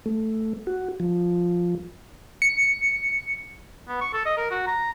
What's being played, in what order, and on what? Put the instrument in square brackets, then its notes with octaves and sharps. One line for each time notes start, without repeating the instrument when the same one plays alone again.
[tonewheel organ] A3
F#4
F3
[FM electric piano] C#7
[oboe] B3
C#6
A4
D#5
A#4
F#4
A#5